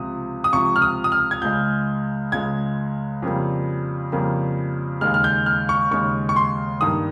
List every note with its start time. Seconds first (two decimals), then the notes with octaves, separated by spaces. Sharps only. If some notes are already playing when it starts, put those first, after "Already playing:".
Already playing: C#2 C3 F3 D#6
0.44 D#6
0.53 C#2 C3 F3 C#6
0.76 F6
0.82 D#6
1.04 D#6
1.12 F6
1.31 G#6
1.42 C#2 C#3 G#3 G6
2.32 C#2 C#3 G#3 G#6
3.22 F2 C#3 G3 A#3
4.12 F2 C#3 G3 A#3
5.01 D#2 C#3 G#3 F6
5.14 F6
5.24 G6
5.46 F6
5.69 C#6
5.91 D#2 C#3 G#3 C#6
6.29 C#6
6.36 C6
6.81 G2 D#3 G3 A#3 D#6